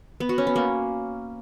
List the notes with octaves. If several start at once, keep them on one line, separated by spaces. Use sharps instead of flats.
B3
F#4
C#4
B3
A#3